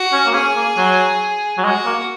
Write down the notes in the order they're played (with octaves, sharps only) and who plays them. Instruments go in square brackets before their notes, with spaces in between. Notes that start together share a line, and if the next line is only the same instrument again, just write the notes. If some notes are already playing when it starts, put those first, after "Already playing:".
Already playing: [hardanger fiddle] F#4
[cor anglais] C#4
A#3
[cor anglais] C#4 [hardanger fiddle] G#4
[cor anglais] A#3
F#3
F#3
[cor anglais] G#3 [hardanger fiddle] F#4
[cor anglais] A#3